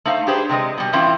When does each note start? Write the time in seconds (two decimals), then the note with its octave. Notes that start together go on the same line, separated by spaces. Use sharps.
0.05 A3 D#4 C5 F5
0.27 D4 G4 G#4 B4 C5
0.49 C3 G3 G#3 D#5
0.78 B2 G3
0.93 A2 E3 C4 C#4 E4 F4